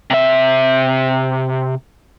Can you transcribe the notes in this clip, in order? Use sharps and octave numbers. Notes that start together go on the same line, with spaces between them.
C3 E5